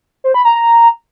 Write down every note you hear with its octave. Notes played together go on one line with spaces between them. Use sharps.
C5
B5
A#5
A#5